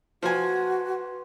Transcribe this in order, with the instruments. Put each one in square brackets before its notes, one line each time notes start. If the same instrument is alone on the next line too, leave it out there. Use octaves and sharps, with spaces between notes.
[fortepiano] F3 G#5 [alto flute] F#4 [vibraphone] B4 C6